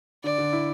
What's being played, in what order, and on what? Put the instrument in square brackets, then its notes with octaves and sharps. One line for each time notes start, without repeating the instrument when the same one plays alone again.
[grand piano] D3 [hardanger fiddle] D5
[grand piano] D3
E4